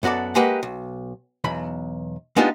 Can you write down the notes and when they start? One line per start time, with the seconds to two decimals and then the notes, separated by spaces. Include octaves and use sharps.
0.03 F#2 B3 F#4 A4 D5
0.35 G#3 A#3 G4 B4 F#5
0.63 B1
1.44 B1 E2 B5
2.36 G#3 B3 D4 D#4 F4 G4